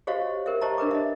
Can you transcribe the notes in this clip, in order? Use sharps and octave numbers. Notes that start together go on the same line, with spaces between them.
F#4 G4 C5 C#5 D#5 F5
G4 A#4 C5 E5
G4 C5 C#5 D#5 A5 A#5
D4 A#4 B4 D6
D#5 E5